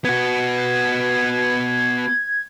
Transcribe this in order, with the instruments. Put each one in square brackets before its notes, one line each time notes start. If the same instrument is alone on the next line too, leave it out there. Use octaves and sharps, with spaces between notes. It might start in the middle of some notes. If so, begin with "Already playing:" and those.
[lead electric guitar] B3 F#4 [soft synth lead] G#6